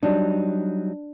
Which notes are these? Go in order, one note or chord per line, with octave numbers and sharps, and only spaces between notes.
F#3 G3 D4 D#4